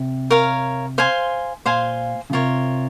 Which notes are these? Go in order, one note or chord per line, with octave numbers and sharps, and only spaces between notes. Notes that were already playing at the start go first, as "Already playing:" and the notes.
Already playing: C3
A#4 C#5 F5
C5 F5 G#5 C6
A#2 C5 F5 G#5 C6
C#3
C3 F4 A#4 C#5